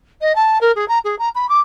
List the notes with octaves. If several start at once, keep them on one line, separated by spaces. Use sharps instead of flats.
D#5
A5
A#4
G#4
A#5
G#4
A#5
B5
D6